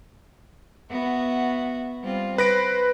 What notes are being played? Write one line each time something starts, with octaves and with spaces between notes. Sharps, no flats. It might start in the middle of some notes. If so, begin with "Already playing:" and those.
B3 F#4 E5
G3 C4 F4
B4 C5 A#6 D7